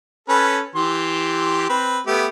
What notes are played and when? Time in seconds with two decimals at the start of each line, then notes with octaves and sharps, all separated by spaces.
0.29 C#4 A4 B4
0.75 E3 G4 C6
1.70 C4 B4
2.07 A3 B3 G4